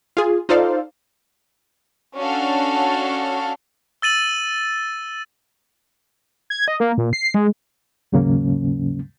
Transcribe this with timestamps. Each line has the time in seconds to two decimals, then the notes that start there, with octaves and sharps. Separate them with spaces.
0.17 F4 G#4
0.49 D#4 F4 A4 C5 D5 F5
2.16 C#4 D4 F#4 A4 F5
4.02 E6 A6 D#7 F#7
6.50 G#6
6.68 D#5
6.80 A#3
6.98 A#2
7.13 C7
7.34 G#3
8.12 D#2 G#2 C#3 F#3 A#3 C#4